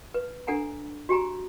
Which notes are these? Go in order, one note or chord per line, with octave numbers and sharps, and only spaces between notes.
B4
D4 A4 F#5 G#5 A#5
F#4 G4 G#5 A#5